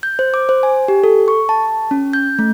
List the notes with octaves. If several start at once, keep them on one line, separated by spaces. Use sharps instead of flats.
G6
C5
D6
C5
G#5
G4
A4
C#6
A5
C#4
G6
A3